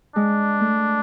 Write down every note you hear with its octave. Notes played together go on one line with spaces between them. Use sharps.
G#3 D4
A3